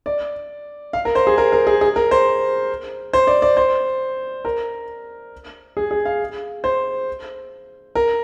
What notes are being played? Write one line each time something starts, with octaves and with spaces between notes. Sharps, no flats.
D5
F5
A#4
C5
G#4
A#4
A#4
G#4
G#4
A#4
C5
C5
D5
D5
C5
A#4
G#4
G#4
F5
C5
A#4